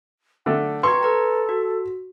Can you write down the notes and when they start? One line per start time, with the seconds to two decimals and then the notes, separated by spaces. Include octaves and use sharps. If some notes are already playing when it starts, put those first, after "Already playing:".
0.46 D3 A3 G5
0.83 B4 A#5 C6 C#6 G#6
1.03 A4 B4 A#5
1.49 F#4